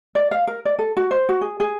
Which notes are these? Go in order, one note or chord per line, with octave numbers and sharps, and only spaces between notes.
D5
F5
A#4
D5
A4
F#4
C5
F#4
G#4
G#4